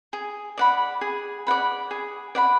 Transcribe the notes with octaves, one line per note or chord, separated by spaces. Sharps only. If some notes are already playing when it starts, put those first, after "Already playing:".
G#4
D5 F#5 B5
G#4
D5 F#5 B5
G#4
D5 F#5 B5